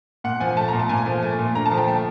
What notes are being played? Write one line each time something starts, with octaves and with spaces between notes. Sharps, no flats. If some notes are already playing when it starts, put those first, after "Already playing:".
A#2 F#5
F3 G#5
A3 A5
A#5
A#2
A5
A#2 G#5
F3
A3
A#2
D3 A#5
A5
F3
G5
A3